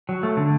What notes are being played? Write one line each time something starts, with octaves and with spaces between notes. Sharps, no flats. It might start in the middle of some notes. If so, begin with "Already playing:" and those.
F#3
A3
D3